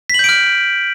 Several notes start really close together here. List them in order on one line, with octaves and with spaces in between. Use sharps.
B6 F#7 G6 D7 F6